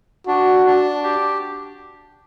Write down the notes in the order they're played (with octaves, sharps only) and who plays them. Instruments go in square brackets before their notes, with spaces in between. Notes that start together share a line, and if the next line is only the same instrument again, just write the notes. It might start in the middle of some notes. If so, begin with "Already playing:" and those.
[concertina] D4 [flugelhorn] F#4
[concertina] D4
G4